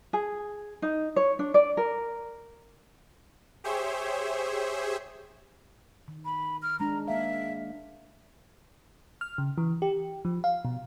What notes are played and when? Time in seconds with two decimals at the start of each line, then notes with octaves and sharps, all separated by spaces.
0.13 G#4
0.82 D#4
1.16 C#5
1.39 D4
1.54 D5
1.77 A#4
3.64 G4 G#4 C5 C#5 E5
6.08 D#3
6.25 B5
6.62 F6
6.80 G#3 D4 A#5
7.08 A#3 E5 F5
9.21 F6
9.38 C#3
9.58 E3
9.82 G4
10.25 F3
10.44 F5
10.65 B2